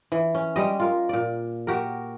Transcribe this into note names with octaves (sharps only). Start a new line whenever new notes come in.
E3
C#4
G3 G#3 G4 D#5
F4 A#4
A#2 D5
F#4 G4 A#4